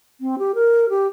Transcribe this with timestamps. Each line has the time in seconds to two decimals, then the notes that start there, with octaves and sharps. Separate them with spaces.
0.21 C4
0.39 G4
0.55 A#4
0.89 G4